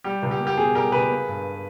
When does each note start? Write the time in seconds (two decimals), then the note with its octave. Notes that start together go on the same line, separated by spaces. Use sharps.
0.04 G3 G4
0.23 C#2
0.31 G4
0.39 A#3
0.47 G4
0.58 B2 G#4
0.75 G3 G4 A#4
0.92 C#2 G#4 B4
1.10 A#3
1.28 G2